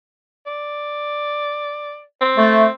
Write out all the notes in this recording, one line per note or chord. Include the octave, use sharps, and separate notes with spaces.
D5
C4
A3